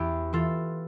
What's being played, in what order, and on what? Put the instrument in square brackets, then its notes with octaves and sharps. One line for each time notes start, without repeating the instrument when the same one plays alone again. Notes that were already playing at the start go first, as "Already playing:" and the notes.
Already playing: [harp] E2 E4 G4
E3 F4 A4